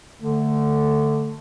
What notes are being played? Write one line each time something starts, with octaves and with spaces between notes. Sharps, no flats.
D3 A3